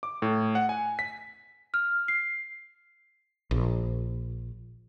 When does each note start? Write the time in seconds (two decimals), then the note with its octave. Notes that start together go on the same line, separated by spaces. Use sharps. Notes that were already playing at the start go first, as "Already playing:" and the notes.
0.03 D6
0.22 A2
0.55 F#5
0.69 G#5
0.99 B6
1.74 F6
2.08 C7
3.51 A#1